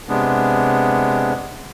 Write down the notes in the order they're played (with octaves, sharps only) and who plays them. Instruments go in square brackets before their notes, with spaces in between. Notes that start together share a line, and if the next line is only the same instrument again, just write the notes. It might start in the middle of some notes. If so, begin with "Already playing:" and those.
[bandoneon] C3 G#3 B3 D4